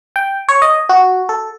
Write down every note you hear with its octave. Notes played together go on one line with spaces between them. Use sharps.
G5
C#5
D#5
F#4
A4